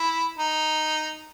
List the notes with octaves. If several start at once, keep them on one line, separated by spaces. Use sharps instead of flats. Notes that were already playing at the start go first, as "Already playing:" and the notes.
Already playing: E4
D#4